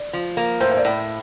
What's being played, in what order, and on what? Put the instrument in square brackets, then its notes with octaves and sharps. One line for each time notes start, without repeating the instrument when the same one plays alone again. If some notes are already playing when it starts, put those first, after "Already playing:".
Already playing: [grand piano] D5
[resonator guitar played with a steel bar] F3
A#3
[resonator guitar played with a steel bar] A2 [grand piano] C5
[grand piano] C5
D5
[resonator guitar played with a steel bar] A2